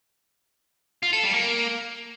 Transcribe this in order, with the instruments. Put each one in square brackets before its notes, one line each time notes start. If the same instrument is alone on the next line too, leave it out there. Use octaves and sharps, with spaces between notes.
[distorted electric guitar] F4
A4
G3
A#3